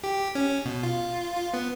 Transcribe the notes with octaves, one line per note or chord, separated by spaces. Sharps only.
G4
C#4
B2
F4
F4
B3